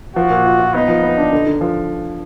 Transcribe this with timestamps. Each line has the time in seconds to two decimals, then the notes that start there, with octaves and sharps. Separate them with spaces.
0.16 F3 F#4
0.30 A#2
0.45 F4
0.59 F4
0.74 B3 D#4
0.88 F3
1.03 B3
1.17 D4
1.32 D3
1.47 D3
1.61 F3